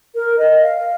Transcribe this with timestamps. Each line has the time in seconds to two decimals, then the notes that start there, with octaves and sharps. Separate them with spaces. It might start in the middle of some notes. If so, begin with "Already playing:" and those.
0.15 A#4
0.38 D#5
0.62 F5